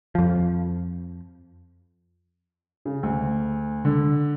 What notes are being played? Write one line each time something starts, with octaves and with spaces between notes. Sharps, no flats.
F2 F3
C#3
D2
D3